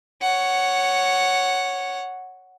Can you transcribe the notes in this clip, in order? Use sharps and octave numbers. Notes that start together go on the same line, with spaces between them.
C#5 F#5